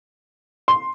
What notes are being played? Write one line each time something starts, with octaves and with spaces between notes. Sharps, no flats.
C6